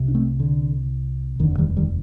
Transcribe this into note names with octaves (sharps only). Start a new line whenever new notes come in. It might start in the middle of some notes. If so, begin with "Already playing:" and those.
Already playing: C2 C3
D4
A3 C4
D3
F1 D#2 D3 D#3
D#3 G3
D#3 G3